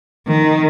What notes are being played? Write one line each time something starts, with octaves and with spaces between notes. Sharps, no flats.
D#3